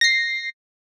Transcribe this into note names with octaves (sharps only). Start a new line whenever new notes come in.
A#6 C7